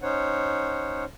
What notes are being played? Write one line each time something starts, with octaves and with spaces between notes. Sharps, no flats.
C#4 D#4 C5 C#5 F#5